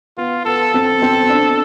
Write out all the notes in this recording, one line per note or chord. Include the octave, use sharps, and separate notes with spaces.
B3 F4
B3 A4
C4 A4
C4
D4